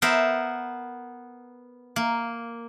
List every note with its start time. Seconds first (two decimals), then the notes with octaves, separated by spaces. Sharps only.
0.02 B3 A#4 C5 E5
1.96 A#3